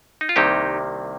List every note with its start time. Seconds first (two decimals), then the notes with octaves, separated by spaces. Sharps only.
0.21 D#4
0.29 F4
0.36 C2 C3 D#3 G3 A#3 D#4 G4